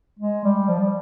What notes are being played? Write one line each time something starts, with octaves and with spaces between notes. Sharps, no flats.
G#3
G3
F3
G3